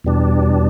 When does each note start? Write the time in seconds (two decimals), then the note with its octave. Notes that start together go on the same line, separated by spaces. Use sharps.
0.04 E2 B2 G3 D4